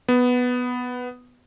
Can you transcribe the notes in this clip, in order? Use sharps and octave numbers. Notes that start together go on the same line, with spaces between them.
B3